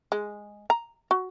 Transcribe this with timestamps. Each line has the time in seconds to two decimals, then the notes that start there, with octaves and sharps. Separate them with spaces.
0.12 G#3
0.70 A#5
1.11 F#4